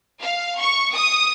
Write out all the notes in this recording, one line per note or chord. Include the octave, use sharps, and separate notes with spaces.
F5
C#6
D#6